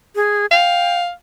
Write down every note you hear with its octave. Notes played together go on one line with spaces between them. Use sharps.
G#4
F5 G5